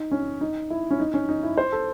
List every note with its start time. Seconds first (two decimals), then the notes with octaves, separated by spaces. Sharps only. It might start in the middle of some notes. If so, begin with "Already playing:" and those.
Already playing: D#4
0.11 C#4
0.41 D#4
0.70 E4
0.91 C#4
1.00 D#4
1.14 C#4
1.29 D#4
1.43 E4
1.57 C5
1.72 A4